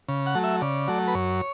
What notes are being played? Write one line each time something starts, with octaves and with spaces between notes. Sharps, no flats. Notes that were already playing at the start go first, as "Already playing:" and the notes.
C#3
F#5
F#3 A3
E5
C#3 D5
F#3 A3
B4
F#2 C#5